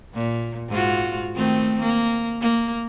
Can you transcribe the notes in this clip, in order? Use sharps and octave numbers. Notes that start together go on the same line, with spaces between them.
A#2
G#2 F4 F#4
D#3 A3 C4
A#3
A#3